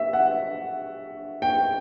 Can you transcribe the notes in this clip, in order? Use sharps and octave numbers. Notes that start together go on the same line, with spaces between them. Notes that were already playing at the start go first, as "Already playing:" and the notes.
Already playing: E5
F#5
G5